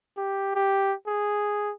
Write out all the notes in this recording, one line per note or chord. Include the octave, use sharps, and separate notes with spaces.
G4
G4
G#4